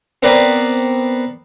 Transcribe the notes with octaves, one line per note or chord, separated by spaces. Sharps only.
B3 C4 A#4 B4 D5